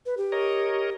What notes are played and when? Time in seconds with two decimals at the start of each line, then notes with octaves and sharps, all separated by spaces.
0.06 B4
0.17 G4
0.32 A#4 C#5 D#5